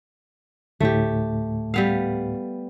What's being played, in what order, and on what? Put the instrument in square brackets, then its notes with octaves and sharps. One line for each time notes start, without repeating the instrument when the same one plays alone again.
[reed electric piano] D2 A2 [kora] A3 G4
[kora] G3 B3 F5